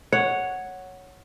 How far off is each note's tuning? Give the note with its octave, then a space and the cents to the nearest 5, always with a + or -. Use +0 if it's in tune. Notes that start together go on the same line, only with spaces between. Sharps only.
C#5 +0 F#5 +0